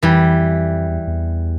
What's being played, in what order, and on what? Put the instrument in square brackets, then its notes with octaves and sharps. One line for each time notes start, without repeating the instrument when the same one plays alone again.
[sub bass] F2 [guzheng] E3 G3
[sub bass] E2
E2